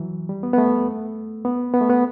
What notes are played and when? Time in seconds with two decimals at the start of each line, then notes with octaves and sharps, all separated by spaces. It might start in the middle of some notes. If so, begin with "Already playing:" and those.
Already playing: E3 F#3
0.29 G3
0.43 B3
0.53 B3
0.58 A3
1.45 B3
1.74 B3
1.81 A3
1.89 B3